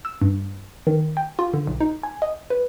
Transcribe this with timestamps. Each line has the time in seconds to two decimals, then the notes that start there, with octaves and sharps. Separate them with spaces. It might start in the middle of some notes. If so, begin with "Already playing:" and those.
0.05 E6
0.22 G2
0.87 D#3
1.17 G5
1.39 F4
1.54 D3
1.67 B1
1.81 D#4
2.03 G#5
2.22 D#5
2.50 B4